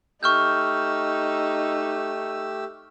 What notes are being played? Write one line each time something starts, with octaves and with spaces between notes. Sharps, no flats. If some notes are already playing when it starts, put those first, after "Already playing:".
A3 D#4 G4 C#6 E6 F6 G6